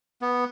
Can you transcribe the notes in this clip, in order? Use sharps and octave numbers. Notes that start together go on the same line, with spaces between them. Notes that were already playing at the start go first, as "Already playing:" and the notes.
B3